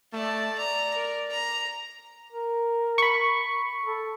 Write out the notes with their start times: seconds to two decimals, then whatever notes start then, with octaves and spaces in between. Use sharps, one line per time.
0.13 A3 D5 A5
0.58 D5 A#5
0.95 A#4
1.30 A#5
2.32 A#4
2.98 B5 C#6
3.85 A4